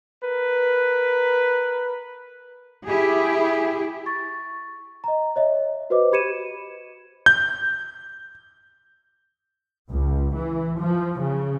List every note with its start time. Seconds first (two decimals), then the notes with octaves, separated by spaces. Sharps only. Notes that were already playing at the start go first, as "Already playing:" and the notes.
0.23 A#4 B4
2.85 E4 G4 G#4
4.06 C#6 A6
5.04 D#5 A#5
5.36 C#5 D#5 E5
5.90 F#4 B4 C5 D#5 D6
6.12 G4 B5 G#6 C#7 D#7 E7
7.26 G6
9.89 C#2
10.34 E3
10.78 F3
11.20 C#3